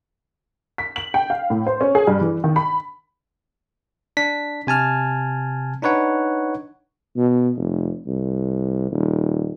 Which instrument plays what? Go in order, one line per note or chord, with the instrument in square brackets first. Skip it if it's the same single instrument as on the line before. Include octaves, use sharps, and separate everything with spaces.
[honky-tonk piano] B6
F#7
G5
F5
A2
C5
C#4
G#4
G2
E3
D#3
B5
[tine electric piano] D4 B6
C3 G#5 A5 F6
D4 D#4 B4 C#5 F#5
[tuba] B2
F1
C2
D#1